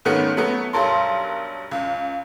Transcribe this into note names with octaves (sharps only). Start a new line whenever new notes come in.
G#2 D#3 A3 B3 C#4
F#3 A3 B3
B1 G2 F#3 A4 A#4 C6
C#2